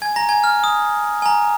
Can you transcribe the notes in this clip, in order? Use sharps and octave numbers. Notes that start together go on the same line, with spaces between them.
G#5 G#6
A#5 A#6
G#5 G#6
F6
D#6
G#5
A#5